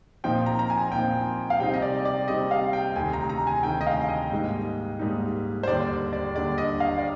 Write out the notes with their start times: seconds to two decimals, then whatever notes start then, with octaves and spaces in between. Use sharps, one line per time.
0.24 A#2 F3 C4 D#4 G5
0.46 A#5
0.59 A#5
0.70 G#5
0.92 A#2 F3 C4 D#4 G5
1.50 F5
1.60 C3 G3 C4 D#4 G5
1.74 D#5
1.82 D5
2.05 D5
2.28 C3 G3 C4 D#4 D#5
2.51 F5
2.73 G5
2.96 D2 C3 D#3 G#5
3.13 A#5
3.30 A#5
3.47 G#5
3.63 D2 C3 D#3 G5
3.81 D#5
3.87 F5
4.09 D#5
4.31 G#2 G3 A#3 D#4
4.99 G#2 G3 A#3 D#4
5.63 C5
5.67 D#2 D3 G3 D4 D5
6.13 D5
6.35 D#2 D3 G3 D4 D5
6.58 D#5
6.80 F5
6.98 D5